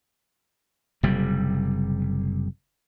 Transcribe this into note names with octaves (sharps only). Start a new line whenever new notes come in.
F#1 C3 G3